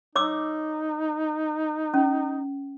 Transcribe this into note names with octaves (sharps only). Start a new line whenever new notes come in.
D#4 C#5 D6 E6
C#4